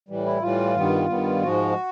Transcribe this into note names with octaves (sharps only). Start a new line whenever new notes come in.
A2 E3 G3
E4
A2 E3 G3 F4
G2 D#3 G3 B3
G2 D#3 G3 B3
G#2 F3 G#3 F#4